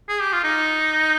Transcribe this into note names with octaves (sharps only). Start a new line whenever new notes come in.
G#4
G4
F4
D#4